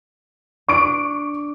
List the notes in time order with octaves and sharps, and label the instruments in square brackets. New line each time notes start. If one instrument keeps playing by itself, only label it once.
[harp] D4 [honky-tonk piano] C#6 D7